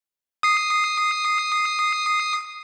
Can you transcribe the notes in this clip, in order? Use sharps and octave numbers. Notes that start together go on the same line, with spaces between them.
D#6 C7